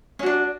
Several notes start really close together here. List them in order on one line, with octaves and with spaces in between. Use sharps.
C#4 F#4 D4